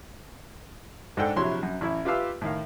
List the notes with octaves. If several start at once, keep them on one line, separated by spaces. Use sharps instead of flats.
G#2 D4 A4 F#5 G5
A#1 C3 F#3 E4 C#5 C6
F#2
A1 E4
F4 G4 B4 E5 F5 E6
A2 D#3 F5